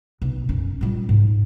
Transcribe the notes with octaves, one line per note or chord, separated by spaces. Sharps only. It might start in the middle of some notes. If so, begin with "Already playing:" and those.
B1
F#2 C#4
A#2 G3
G#2